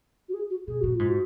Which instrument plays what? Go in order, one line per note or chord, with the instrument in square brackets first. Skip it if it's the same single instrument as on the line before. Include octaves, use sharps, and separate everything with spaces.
[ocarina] F#4
G#4
F#4
[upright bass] B2 [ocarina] G#4
[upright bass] A#2 [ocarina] F#4
[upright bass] G#2 [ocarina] F4
[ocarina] F#4